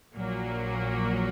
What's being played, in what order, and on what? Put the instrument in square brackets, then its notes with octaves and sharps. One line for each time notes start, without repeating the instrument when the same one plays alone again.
[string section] A#1 A#2 F#3 A#3